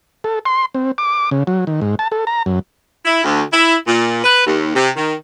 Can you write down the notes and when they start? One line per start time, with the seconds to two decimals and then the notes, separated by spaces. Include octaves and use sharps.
0.24 A4
0.45 C6
0.74 C4
0.98 D6
1.31 C#3
1.47 F#3
1.67 D#3
1.81 G#2
1.99 A5
2.12 A4
2.27 A#5
2.46 F#2
3.05 E4
3.24 D2
3.52 E4
3.87 A#2
4.23 B4
4.45 D#2
4.75 C3
4.96 D#3